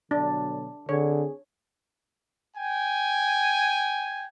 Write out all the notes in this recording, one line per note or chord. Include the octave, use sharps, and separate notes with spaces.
B2 D3 F#3 D4
D3 C4 D4 G#4 C#5
G5 G#5